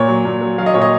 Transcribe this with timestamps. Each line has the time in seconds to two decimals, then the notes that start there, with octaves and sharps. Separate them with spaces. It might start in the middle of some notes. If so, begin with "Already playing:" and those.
Already playing: A#2 C#5
0.08 F#3
0.25 A#2
0.41 F#3
0.58 F#3 F5
0.66 D#5
0.74 A#2 C#5
0.82 D#5